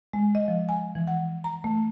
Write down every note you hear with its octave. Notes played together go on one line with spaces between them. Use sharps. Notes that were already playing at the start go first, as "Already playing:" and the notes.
G#3
D#5
F3
G#5
E3
F#5
A#5
A3